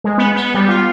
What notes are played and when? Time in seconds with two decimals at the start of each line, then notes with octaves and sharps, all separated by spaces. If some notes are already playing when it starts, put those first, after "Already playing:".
0.04 G#3
0.18 B3
0.36 B3
0.54 G3
0.69 F4